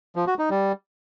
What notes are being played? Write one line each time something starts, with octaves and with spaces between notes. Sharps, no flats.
F3
F#4
D#4
G3